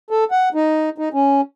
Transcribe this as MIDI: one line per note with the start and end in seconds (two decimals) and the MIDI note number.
0.10 0.24 69
0.31 0.49 78
0.54 0.89 63
0.98 1.09 63
1.14 1.41 61